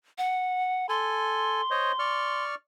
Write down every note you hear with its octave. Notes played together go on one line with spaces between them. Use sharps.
F#5
A4 G#5 C6
C5 C#5 D#5
D5 C#6 F6